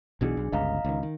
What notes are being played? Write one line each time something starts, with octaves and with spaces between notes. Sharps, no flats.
B1 B2 E3 D4 G#4
B1
G1 C#2 D#5 F5 A#5
C#2 D#3
D#3